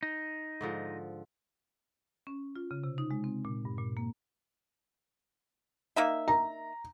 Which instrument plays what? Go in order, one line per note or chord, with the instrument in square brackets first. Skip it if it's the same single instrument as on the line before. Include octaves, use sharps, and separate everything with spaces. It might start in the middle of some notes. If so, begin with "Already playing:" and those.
[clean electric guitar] D#4
[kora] G#2 D3 F3
[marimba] C#4
F4
C#3
C3
D#4
G#3
C4
A#2
G2
A#2
A#3
[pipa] A#3 D#4 E5
[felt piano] A#5